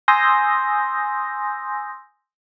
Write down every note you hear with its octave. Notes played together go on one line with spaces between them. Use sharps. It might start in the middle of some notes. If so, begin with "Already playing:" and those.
G#5 C6 D#6 E6 G6 A#6